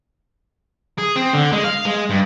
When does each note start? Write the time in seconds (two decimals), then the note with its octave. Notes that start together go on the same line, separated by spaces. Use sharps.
0.98 G#4
1.16 C4
1.33 D3
1.53 G#3
1.64 F5
1.85 G#3
2.10 G2